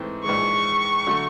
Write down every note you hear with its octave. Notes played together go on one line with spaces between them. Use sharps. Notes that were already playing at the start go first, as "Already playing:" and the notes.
Already playing: G#2 E3 A3 C4
A#1 G#2 E3 G#3 C#6
D3 F#3 A3